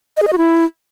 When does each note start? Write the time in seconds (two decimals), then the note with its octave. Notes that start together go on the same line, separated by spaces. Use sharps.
0.17 D#5
0.22 G#4
0.27 D#5
0.33 F#4
0.38 E4